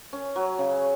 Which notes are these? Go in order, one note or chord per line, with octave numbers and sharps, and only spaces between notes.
C#4
F#3
C#3